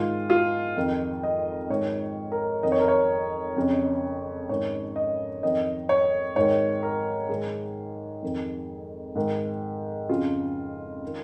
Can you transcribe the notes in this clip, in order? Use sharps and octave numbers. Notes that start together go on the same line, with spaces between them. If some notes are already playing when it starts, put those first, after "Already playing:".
Already playing: G#2 D#3 F4
F4
F2 D#3
D#5
G#2 D#3 C#5
A#4
F2 D#3 D#5
C#5
A#4
C#5
F2 C#3
G#2 D#3 C#5
D#5
F2 D#3 D#5
C#5
G#2 D#3 C#5
A#4
G#2 D#3 G#4
F2 D#3
G#2 D#3
F2 C#3 F4
D#3